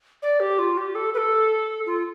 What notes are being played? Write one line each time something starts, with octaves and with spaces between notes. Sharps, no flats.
D5
G4
F4
G4
A4
B4
A4
F4